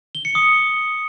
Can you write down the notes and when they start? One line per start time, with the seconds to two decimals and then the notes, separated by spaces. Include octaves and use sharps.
0.15 G7
0.25 C#7
0.35 D#6